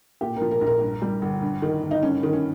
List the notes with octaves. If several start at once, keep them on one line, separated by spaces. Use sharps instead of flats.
A#2 G4
F3 A#4
A#4
A#1
A#4
G2
G3
G1
G2
D#3
G1
D#4
G2 C#4
D#3
C#4